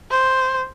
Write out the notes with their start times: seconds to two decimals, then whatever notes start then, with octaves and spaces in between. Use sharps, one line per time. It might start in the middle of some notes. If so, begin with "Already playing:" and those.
0.11 C5